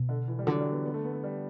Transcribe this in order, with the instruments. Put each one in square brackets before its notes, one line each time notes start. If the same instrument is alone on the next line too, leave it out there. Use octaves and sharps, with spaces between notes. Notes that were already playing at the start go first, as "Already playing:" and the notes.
Already playing: [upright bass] B2
[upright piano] D3
E3
G3
[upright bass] D3 [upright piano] F#3
[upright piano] G3
B3
B3
A3
B3
A3
G3